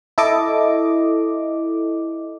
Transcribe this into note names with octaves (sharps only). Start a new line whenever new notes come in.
E4 A4 D#5 D6